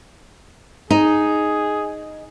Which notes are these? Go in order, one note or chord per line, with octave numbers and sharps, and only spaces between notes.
D#4 G#4